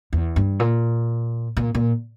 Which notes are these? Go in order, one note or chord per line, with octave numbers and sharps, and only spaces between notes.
E2
G2
A#2
A#2
A#2